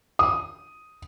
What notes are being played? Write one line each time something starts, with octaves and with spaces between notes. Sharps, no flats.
D#6